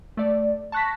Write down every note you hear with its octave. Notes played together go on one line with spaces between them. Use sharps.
A3 D5
A5 C#6 F#6 A#6 B6